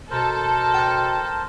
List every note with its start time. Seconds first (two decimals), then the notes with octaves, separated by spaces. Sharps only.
0.11 B2 A4 A#4 C5
0.74 G5 F6